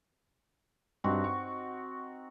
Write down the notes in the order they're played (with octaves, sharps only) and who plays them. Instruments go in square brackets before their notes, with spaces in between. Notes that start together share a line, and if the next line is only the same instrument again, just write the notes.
[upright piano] G2 [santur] C4 D#4 F#4
[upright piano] C#6